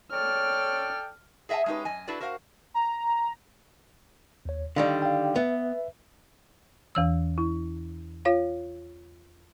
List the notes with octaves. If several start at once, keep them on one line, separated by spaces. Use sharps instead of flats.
A4 C#5 D5 G5 F6
G#4 D#5 E5 F#5 G#5 A5
G#3 C#4 D#4 G4 B4
F#2 D#5 G#5
D4 E4 F#4 A4 B4 D5
F#4 A#4 C5 D#5 F5 F#5
A#5
D#2 C#5
D3 D#3 G3 F5
F5 G5
B3 B4 E5
E2 E3 E6
E4
F4 C#5 F5